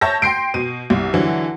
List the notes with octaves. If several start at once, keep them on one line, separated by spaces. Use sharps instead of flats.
C#5 E5 A5 G6 A#6
G5 C6 C7 D7
B2 D#7
C2
D3 E3 F#3